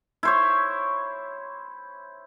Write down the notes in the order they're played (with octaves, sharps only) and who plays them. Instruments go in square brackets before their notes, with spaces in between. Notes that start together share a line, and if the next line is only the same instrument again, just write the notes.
[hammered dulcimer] E4 C5 C#5